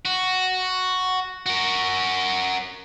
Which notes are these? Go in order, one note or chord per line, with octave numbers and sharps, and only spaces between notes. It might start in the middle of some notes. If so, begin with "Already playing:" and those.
F#4
F#4 A#4